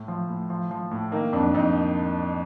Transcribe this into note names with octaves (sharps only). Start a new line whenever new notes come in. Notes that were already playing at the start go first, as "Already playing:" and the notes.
Already playing: A2
F3
A2
F3
F3
A2
D#3 A#3
F2 D4
F2 D#4